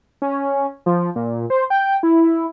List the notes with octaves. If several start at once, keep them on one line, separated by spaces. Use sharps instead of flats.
C#4
F3
A#2
C5
G5
E4